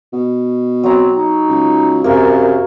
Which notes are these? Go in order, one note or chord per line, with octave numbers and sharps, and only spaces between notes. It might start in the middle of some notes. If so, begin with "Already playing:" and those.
B2
F#3 C4 A#5
D#4
C#2
F#2 C3 A#3